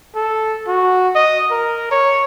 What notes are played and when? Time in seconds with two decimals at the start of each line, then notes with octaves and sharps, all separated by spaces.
0.16 A4
0.67 F#4
1.15 D#5
1.51 A#4
1.91 C#5